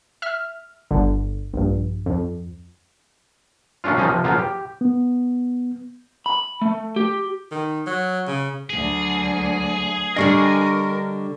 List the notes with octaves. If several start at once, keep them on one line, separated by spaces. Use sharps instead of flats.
E5 F6
G1 D3
A#1 G2
F2
F#3 A3 C#4 D4 F4
F3 G3 C#4 D#4 G#4
C3 F3
C#3 F3 F#3 A#3 B3 F4
G4
B3
B5
A3
G4
D#3
F#3
C#3
D2 F#3 G#4
D3 G3 D4 A#4 D#5 G5 C#6